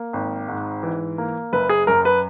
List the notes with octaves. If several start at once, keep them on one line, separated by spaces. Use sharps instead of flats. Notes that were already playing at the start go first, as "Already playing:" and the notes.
Already playing: A#3
G#1
G#2
E3
A#3
F#1 B4
G#4
F#2 A#4
B4